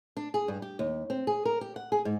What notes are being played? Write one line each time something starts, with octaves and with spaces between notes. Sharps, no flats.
D4
G#4
G2
G4
D#2
C4
G#4
A#4
G4
F#5
G#4
G#2